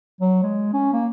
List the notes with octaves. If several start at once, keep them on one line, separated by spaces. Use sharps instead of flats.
F#3
G#3
C#4
A#3